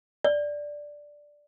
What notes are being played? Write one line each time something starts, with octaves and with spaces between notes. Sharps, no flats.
D5